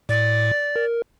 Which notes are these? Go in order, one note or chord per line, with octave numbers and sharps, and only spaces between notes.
A2 D5
A#4